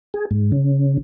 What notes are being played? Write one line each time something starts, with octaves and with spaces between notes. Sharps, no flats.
G#4
G#2
C#3